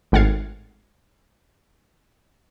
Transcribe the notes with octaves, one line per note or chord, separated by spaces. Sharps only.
G#1 A2 F#5 F6 G#6 C7